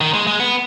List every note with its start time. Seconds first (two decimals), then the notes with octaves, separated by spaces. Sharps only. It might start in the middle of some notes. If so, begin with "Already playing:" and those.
0.01 D#3
0.14 G#3
0.27 G#3
0.40 B3